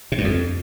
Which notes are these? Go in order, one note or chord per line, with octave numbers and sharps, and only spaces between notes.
C3
G2
F2